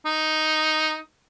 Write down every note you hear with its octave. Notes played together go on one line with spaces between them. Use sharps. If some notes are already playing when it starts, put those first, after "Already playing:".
D#4